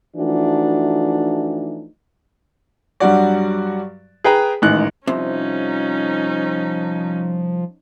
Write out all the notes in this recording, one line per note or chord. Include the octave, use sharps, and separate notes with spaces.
E3 F3 A3 D4 D#4 F#4
G2 F#3 G3 F#4 D5
G#4 B4 G5 A#5
A1 G#2 D#3 F#6
C2 C3 F3 C#4 D#4